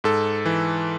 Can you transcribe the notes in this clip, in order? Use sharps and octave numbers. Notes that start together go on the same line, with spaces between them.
G#2 A4
E3